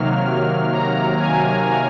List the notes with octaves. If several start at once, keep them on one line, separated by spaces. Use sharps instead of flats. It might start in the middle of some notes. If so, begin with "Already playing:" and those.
Already playing: C3 D#3 F#3 A#3 F6
F6
A#5
G#5